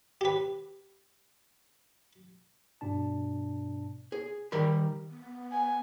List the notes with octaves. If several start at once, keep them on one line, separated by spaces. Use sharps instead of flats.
G4 B4
G2 B2 D4 A5
G#4
D#3 G3 A#4 B5
B3
G#5